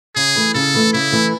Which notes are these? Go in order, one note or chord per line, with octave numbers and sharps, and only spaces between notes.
C#3 G#4
E3 A3
C#3 A4
E3 A3
C#3 E4
E3 A3